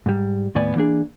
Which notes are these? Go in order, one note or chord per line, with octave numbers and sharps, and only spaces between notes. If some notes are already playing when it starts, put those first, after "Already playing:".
G#2 G3
D#2 A2 B3 D5 G#5
E3 A#3 D4 G#4